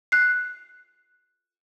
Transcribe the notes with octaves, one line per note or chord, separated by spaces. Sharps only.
F#6 C7